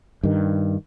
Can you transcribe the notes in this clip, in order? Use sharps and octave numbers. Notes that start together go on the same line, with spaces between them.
G2 D#3